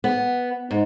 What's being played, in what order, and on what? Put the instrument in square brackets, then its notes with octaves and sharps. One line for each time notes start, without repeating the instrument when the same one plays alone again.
[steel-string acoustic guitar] B3
G#2